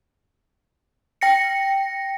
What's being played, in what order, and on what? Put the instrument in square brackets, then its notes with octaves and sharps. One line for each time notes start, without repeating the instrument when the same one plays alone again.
[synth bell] G5 A#6 C#7